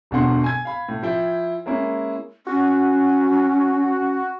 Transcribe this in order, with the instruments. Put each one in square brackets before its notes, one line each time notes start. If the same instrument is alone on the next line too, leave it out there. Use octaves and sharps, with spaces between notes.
[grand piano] E1 B2 D3 F#5 C6
G#5 G#6
F5 B5
A2
F3 E4 G5
G#3 A#3 C#4 E4
[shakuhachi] C#4 [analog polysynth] F#4